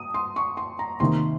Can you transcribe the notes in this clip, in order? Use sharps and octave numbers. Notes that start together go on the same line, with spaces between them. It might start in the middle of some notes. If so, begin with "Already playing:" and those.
Already playing: D#6
C6
C#6
C6
A#5
C3 D#3 A#3 D#4 C6